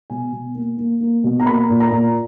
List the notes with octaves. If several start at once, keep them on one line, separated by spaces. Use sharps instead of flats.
B2 G#5
B2
A#3
A#3
A#3
B2
A#5
A#3 B5
A#2
A#5
A#2